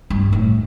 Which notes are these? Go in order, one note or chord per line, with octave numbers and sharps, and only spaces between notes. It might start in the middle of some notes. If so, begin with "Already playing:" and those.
G2
A2